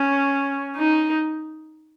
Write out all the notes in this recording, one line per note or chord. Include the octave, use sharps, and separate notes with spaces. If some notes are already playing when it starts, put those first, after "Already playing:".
Already playing: C#4
D#4